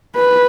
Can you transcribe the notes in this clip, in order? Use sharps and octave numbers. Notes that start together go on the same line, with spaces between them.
B4